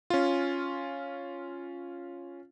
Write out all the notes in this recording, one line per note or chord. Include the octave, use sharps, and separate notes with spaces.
C#4 F4